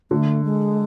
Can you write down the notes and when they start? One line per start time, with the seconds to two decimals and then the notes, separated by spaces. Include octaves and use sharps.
0.11 D3 A3
0.44 G#3